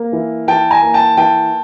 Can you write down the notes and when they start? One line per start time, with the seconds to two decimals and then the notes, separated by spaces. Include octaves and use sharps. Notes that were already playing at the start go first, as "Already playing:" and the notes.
Already playing: A#3
0.12 E3
0.48 E3 G5 A5
0.71 G#5 A#5
0.82 A#3
0.94 G5 A5
1.17 E3 G5 A5